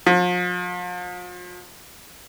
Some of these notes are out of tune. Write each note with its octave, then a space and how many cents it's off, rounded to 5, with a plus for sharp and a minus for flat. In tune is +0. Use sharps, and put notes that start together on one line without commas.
F3 +40